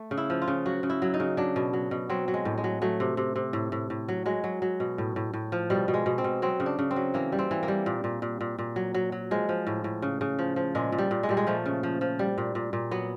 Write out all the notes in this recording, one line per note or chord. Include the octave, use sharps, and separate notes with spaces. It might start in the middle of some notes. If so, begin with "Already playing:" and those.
Already playing: A3
C#3
E4
F3
F4
C#3
F#3 F#4
C#3
E4
F#3
D#4
C#3
F#3 D4
B2
F#3
B2
F#3 C4
F#3
G#3
A2
G#3
F#3
F#3 A3
C3
C3
C3
A2
A2
A2
F#3
F#3 G#3
F#3
F#3
B2
A2
A2
A2
F3
B2 G3
B2
G#3
B2
C4
B2
F#3 C4
C#3
D4
C#3
C4
F#3
E3 A#3
G3
C4
E3
A#3
G3
A#2
A#2
A#2
A#2
A#2
F#3
F#3
F#3
F3 G#3
F3
A2
A2
C#3
C#3
F3
F3
A#2 G#3
A#2
G3
A#2
G#3
A#2 G3
G#3
F3 A3
C#3
F3
F3
G3
A#2
A#2
A#2
F#3 B3